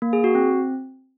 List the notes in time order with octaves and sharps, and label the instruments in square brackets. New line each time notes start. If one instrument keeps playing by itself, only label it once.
[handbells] A#3
G#4
F#4
C4